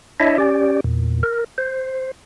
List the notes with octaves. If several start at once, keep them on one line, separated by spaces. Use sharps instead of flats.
D4 E4 C#5 D#5 E5
C#4 G4 D5
E2 A#2
A#4
C5